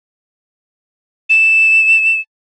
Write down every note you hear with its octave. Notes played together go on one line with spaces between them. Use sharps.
E7